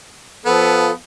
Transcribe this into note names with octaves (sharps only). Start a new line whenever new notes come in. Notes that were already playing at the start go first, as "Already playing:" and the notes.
F3 B3 A4